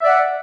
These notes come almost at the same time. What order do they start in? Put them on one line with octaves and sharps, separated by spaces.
E5 D5 F#5